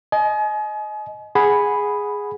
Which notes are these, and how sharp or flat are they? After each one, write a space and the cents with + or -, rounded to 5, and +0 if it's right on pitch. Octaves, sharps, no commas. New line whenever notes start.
D#5 +0 G#5 +40
G#4 +0 F#5 +0 B5 +0